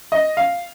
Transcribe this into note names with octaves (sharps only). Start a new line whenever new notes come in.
D#5
F5